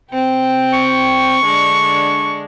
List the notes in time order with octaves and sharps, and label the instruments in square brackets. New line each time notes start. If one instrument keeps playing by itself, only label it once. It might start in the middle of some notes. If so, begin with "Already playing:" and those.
[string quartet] C3 C4 G5
[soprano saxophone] C#6
[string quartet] D3 G#3 D4